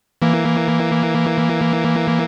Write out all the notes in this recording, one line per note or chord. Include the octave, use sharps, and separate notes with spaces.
E3 A#3